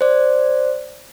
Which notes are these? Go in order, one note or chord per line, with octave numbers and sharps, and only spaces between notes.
C5 D5